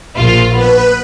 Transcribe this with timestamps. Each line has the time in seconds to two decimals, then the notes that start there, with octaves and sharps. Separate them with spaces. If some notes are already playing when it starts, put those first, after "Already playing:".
0.15 A#1 F4
0.56 B3 B4